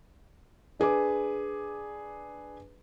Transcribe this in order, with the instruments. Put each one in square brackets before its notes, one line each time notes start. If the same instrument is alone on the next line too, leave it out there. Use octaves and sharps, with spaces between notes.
[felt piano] D4 G#4 B4 D6